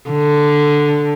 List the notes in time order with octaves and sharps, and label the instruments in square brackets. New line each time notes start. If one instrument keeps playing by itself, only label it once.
[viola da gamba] D3